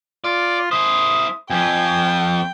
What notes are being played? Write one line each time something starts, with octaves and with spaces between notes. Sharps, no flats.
F4 D5
E4 C5 D#6
F2 F3 G5 G#5